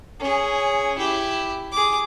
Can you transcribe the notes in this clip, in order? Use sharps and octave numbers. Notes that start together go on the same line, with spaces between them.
C#4 G#4
E4 G4
G#4 D6